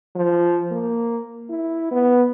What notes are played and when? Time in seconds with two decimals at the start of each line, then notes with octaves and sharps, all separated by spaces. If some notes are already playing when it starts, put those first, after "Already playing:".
0.16 F3
0.71 A#3
1.49 E4
1.91 B3